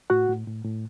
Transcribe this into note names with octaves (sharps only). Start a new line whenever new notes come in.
A2 F#4 F#5
A2
A2
A2